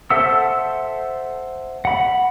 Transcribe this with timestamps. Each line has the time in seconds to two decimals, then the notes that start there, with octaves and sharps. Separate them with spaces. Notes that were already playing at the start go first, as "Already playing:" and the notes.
0.10 A4 C5 E5 F#5 E6
1.85 F#5 B5